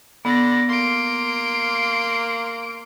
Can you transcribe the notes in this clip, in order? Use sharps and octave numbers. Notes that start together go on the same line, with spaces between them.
D3 B3 D5 A#6
A#3 C6 D7